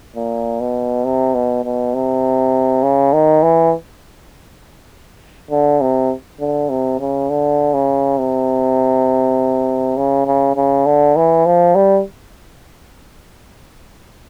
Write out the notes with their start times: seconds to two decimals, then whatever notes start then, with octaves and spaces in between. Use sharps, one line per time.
0.16 A#2
0.60 B2
1.05 C3
1.34 B2
1.65 B2
1.94 C3
2.83 C#3
3.13 D#3
3.42 E3
5.51 D3
5.81 C3
6.40 D3
6.69 C3
7.00 C#3
7.29 D3
7.74 C#3
8.18 C3
9.97 C#3
10.26 C#3
10.56 C#3
10.86 D3
11.16 E3
11.46 F3
11.75 G3